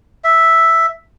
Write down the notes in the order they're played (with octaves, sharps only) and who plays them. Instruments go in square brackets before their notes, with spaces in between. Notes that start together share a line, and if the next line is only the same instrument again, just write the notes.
[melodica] E5